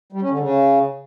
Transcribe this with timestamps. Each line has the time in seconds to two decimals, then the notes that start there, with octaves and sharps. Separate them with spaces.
0.12 G3
0.21 C#4
0.30 D3
0.39 C#3